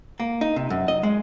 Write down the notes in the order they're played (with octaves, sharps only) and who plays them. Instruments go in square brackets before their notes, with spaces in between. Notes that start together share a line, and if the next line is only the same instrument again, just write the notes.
[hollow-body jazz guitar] A#3
D#4
C3
F#2
D#5
G#3